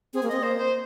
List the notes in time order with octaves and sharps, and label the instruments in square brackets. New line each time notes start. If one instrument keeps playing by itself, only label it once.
[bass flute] C4 [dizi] G#4
[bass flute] A#3
[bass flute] C4 [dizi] D#5
[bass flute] A#3 [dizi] C5
[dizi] C5